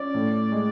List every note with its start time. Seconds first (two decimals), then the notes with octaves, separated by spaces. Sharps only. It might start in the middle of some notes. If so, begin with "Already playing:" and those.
Already playing: C#4 D5
0.14 A2
0.52 G#3